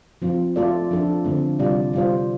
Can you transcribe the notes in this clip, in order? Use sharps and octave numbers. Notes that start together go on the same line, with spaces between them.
F3 C4 F4
A3 F4 A4 D5
F3 D4 A4
D3 A3 C4
C3 G3 F4 D5
G3 F4 C5